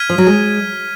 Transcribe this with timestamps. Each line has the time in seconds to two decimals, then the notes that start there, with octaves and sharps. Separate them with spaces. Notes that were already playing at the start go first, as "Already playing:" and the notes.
Already playing: F6 G#6 B6 D#7
0.09 F3
0.18 F#3
0.27 G#3